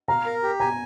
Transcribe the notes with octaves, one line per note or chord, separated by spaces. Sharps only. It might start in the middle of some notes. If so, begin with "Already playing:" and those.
F5 A#5
A#4
G4
G#5 A#5